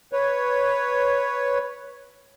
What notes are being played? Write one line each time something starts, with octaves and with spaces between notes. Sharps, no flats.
B4 C#5